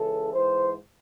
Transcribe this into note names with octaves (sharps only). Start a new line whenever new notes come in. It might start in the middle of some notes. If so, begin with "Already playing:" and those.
Already playing: C#2 C#3 E3 A4
G#2 E3 C5